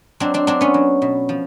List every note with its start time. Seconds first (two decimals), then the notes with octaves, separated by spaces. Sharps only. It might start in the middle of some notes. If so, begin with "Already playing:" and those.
0.20 F#3 C4 D4
0.34 C4 D4
0.47 F#3 C4 D4
0.61 B3 C#4
0.74 F#3
1.02 B2
1.29 F3